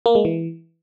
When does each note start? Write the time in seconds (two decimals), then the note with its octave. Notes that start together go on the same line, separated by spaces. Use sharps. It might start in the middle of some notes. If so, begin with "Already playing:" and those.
0.06 A#3
0.15 G#3
0.25 E3